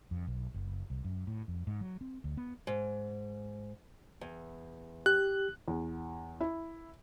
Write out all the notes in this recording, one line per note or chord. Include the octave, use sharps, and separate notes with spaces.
F2
B1
F#1
C2
F#2
A2
F2
G#2
F#3
C4
D2
B3
G#2
E2
G4 F#6
E2
E4